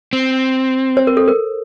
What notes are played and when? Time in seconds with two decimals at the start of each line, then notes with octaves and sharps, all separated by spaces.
0.13 C4
0.97 C5
1.07 A#4
1.17 A4
1.28 A#4